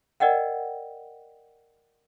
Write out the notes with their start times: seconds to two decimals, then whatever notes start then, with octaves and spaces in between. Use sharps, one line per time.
0.20 A#4 D5 D#5 F#5 G5